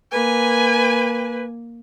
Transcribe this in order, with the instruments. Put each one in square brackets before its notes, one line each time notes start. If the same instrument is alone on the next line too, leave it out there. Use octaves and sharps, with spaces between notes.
[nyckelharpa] A#3 [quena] B4 [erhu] G#5